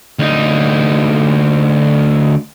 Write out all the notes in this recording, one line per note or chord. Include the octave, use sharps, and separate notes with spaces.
D2 D#4